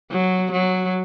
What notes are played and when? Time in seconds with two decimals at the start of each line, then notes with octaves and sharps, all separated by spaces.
0.11 F#3
0.52 F#3